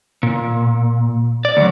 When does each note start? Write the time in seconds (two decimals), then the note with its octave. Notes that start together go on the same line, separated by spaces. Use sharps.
0.23 A#2
1.45 D5
1.57 D2 F#3